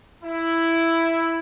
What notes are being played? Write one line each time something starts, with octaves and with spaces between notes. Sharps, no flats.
E4